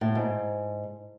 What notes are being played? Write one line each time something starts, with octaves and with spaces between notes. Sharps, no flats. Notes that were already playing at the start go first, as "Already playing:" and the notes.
A2
G#2